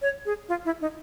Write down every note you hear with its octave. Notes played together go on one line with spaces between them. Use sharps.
C#5
G#4
F4
E4
D#4